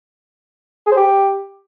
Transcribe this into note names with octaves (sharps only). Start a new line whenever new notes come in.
G#4
C5
G4